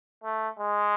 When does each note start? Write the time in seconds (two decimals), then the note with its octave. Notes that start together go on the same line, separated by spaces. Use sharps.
0.24 A3
0.59 G#3